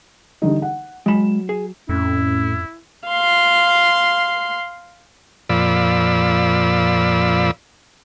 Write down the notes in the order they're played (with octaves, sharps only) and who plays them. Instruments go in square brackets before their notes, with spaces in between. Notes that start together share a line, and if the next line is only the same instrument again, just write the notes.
[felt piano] D3 G3 D#4
F#5
[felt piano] F#3 E7 [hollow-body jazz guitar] G#3 B5
[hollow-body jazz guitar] G#4
[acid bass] F2 [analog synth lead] A2 [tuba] C#4 [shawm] E4
[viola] F5 C6
[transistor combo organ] F2 A#2 F3 D5 B5 E6